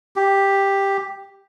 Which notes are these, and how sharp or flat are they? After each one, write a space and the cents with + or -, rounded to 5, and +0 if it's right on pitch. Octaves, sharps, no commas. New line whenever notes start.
G4 +5